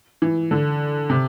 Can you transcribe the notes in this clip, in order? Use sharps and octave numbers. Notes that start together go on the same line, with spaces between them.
E3
D3
C3